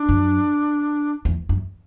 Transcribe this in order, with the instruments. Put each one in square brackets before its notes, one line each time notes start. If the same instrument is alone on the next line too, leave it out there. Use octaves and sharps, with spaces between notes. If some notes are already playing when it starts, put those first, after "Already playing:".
Already playing: [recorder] D4
[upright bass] F#2
E2
F#2